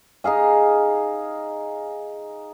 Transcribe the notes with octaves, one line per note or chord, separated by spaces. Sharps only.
D#4 G#4 F5 G#5